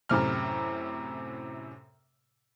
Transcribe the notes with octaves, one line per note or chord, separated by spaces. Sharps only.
F#2 A2 C3 F6